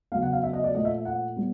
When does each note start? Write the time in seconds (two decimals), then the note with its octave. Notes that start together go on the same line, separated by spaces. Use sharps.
0.12 C#3 F#3 B3 F5
0.22 F#5
0.33 F5
0.43 E5
0.53 D#5
0.64 D5
0.74 A#2 F3 A3 D#5
0.85 E5
1.05 F#5
1.36 G3 B3